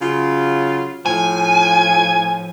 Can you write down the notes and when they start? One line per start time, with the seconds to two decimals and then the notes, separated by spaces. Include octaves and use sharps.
0.02 C#3 F#3 F4
1.06 A2 F3 G#5